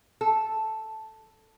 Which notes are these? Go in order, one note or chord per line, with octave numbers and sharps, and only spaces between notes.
A4